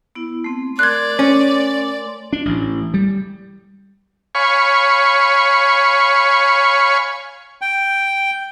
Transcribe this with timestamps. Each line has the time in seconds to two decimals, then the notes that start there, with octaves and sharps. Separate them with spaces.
0.15 B3 E4
0.44 A3 C4
0.79 A3 A#4 D5 C6 F#6 G#6
1.19 C#4
2.33 D4
2.45 A1
2.94 G3
4.35 C#5 F5 G#5 B5 C#6
7.62 G5